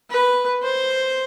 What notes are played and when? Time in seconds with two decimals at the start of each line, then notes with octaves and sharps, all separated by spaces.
0.10 B4
0.62 C5